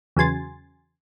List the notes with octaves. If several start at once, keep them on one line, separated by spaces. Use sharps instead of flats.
E2 C#3 F#3 G#5 C6 A6